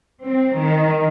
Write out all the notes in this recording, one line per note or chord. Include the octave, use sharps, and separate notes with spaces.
C4
D#3